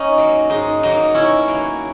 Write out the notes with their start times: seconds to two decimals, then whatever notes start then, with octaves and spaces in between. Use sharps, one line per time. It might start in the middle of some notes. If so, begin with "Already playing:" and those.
Already playing: C#4 D#4
0.18 F#3 A#3
0.50 G#2 D#4
0.83 F#3 A#3 D#4
1.14 B2 C#4 E4
1.47 F#3 A#3